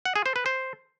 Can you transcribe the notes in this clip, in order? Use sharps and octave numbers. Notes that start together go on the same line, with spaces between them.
F#5
G#4
C5
B4
C5